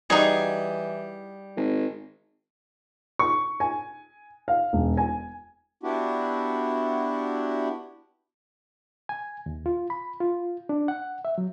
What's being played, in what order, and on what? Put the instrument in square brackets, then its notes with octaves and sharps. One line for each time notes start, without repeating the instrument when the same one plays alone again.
[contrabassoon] E3 [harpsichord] G3 [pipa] D#4 F#4 G#4
[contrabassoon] G#1
[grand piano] C#6
G#5
F5
E1
G#5
[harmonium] B3 D4 E4 F#4 G4
[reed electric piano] G#5
D#2
F4
B5
F4
D4
F#5
E5
F#3